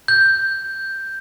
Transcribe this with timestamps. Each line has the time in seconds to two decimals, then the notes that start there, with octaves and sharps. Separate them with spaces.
0.08 G6